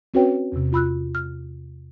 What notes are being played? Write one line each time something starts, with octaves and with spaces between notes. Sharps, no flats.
C4 C#4 F#4 B4 C#5 G5
E2 C3
F4 B5 E6 F#6
F6